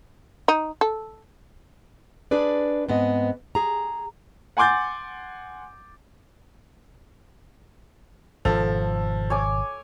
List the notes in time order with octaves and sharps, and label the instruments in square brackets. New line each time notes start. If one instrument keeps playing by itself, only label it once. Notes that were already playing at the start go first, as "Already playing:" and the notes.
[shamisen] D#4
A4
[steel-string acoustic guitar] D4 G#4 B4 D5
G#2 B3 C4 D#5
G#4 A#5
[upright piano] F#5 G#5 C6 D6 G6 A6
[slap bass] G#1 B2 [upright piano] F3 [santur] A4
[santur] C#5 G#5 D6